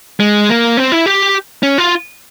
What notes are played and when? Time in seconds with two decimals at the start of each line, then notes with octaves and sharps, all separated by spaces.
0.20 G#3
0.49 A#3
0.77 C4
0.92 E4
1.06 G4
1.63 C#4
1.78 F4